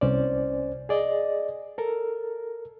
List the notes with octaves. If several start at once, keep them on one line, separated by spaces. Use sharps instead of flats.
C2 C#4 C5 D5
G#4 D5 D#5
A4 A#4